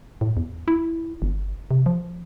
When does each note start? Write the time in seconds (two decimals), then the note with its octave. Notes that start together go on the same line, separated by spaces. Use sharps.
0.21 A2
0.37 E2
0.68 E4
1.22 G1
1.71 C3
1.86 F3